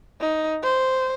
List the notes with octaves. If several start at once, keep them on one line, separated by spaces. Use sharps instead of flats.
D#4
C5